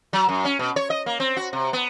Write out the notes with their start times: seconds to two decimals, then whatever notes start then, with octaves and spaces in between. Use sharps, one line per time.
0.13 F#3
0.29 F#2
0.45 C#4
0.59 B2
0.76 C#5
0.90 D#5
1.06 A#3
1.20 C4
1.37 F#4
1.53 C3
1.73 B3